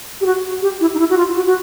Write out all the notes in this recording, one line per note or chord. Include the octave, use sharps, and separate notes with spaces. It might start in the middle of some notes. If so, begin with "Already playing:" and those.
G4
F#4
G4
E4
D#4
E4
F#4
F4
F#4
F#4